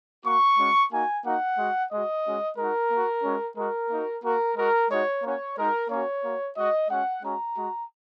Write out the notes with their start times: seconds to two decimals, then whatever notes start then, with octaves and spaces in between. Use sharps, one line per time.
0.24 A#3 F#4 C#6
0.58 G#3 C#4 F#4
0.92 A#3 D#4 F#4 G#5
1.24 A#3 D#4 F#4 F#5
1.58 G#3 F#4
1.91 G#3 F#4 D#5
2.24 G#3 C#4 F#4
2.57 G#3 D#4 F#4 A#4
2.91 A#3 F#4
3.24 G#3 C#4 F#4
3.57 G#3 F#4 A#4
3.90 A#3 D#4 F#4
4.24 A#3 F#4 A#4
4.57 G#3 F#4 A#4
4.90 G#3 D#4 F#4 C#5
5.23 A#3 C#4 F#4 C#5
5.57 G#3 D#4 F#4 A#4
5.90 A#3 C#4 F#4 C#5
6.24 A#3 F#4
6.56 G#3 F#4 D#5
6.90 G#3 C#4 F#4 F#5
7.23 G#3 C#4 F#4 A#5
7.57 G#3 F#4